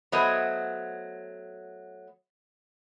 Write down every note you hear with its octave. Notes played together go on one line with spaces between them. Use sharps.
F#3 A3 B3 C5 C#5 D#5